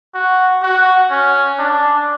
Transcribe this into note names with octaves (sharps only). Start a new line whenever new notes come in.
F#4
F#4
C#4
D4